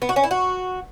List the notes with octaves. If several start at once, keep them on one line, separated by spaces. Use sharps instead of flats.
B3
F#4
C#4
E4
F#4